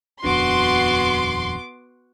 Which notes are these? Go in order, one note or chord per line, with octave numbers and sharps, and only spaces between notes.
D#1 F2 B3 D4 F#4 C6 D6